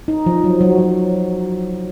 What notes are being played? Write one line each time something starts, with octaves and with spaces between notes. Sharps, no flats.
D#4
F3
F#3
F#3
F#3